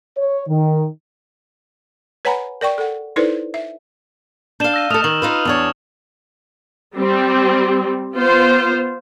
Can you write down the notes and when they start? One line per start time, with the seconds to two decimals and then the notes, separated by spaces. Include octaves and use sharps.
0.17 C#5
0.48 D#3
2.25 B4 C#5 F#5 G#5 A#5 B5
2.61 A#4 D5 G5 C#6
2.78 A4 F#5
3.16 D#4 E4 A4 B4 C5 D5
3.54 E5
4.60 D4 F5 G6 E7 G7
4.74 E6 A#6 D#7
4.90 A3 A4 D#6 F6 F7
5.04 D#3 F#7
5.22 D#4 F4 B4
5.45 E2 D4 C#5
6.95 G3 C4
8.16 B3 F4 C5